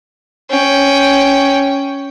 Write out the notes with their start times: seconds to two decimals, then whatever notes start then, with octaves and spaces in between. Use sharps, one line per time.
0.50 C#4 G5